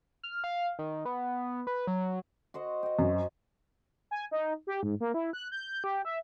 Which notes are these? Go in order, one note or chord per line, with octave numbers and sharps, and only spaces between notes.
F6
F5
D#3
B3
B4
F#3
F#4 C5 D#5
D#5 G5
F#2
G#5
D#4
G4
G#2
A#3
E4
F#6
G6
G4
E5